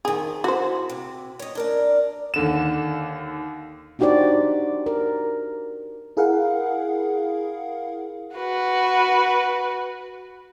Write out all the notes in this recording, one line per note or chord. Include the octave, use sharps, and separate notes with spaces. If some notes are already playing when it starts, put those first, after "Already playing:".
F2 D#3 G#4
E4 F#4 C5
C3
C#5 D#5
D4 A#4 D5
D#2 D3 E7
D4 D#4 F#4 G4 C5 D5
A#4
E4 G#4 A#4 F5 F#5
F#4 B4